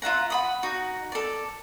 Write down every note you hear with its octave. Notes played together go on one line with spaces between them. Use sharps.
F4 E5 F#5 A#5
F#5 B5 D#6
D#4 F#4
A4 D5